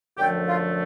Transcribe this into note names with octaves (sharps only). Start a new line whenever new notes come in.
F#2 D3 F3 A3 G4 G5
F4 F5